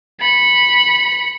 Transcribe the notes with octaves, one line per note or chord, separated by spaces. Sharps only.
B5 C#7